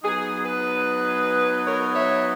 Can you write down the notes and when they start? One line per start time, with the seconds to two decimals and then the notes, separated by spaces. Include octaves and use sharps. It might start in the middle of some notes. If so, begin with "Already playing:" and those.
0.03 F#3 B3 D#4 G#4
0.44 G#4 B4
1.67 A#4 C#5
1.94 C#5 E5